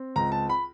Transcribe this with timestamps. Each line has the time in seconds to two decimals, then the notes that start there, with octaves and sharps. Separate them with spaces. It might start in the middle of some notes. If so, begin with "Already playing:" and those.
Already playing: C4
0.16 C#2 A#5
0.32 A5
0.49 B5